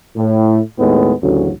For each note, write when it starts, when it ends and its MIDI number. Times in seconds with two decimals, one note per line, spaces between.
0.17 0.60 45
0.79 1.13 39
0.79 1.13 45
0.79 1.13 56
0.79 1.13 59
1.22 1.51 33
1.22 1.51 38
1.22 1.51 49
1.22 1.51 54